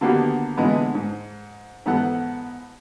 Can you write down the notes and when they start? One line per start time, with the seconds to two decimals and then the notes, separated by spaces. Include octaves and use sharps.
0.01 D3 D#3 A#3 B3 F#4 G4
0.57 A#2 D3 E3 G#3 B3
0.95 G#2
1.86 G#2 E3 B3 A4 F#5